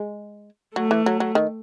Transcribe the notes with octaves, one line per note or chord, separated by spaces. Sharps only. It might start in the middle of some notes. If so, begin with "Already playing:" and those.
Already playing: G#3
F#3 A3
E3
F#3
F#3
D#3